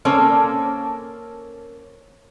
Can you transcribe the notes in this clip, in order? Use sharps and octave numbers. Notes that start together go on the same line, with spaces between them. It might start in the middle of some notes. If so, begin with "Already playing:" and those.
A#3 C#4 A4 C5